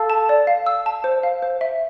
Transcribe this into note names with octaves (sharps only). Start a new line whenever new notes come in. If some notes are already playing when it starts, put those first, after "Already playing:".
Already playing: A4 F5
A5
D5
F5
E6
A5
C5
F5
C5
E5